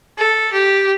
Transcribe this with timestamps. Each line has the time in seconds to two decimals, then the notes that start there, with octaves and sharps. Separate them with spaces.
0.19 A4
0.53 G4